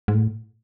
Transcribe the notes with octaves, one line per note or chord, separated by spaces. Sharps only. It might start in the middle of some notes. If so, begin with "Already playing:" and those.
G#2
A2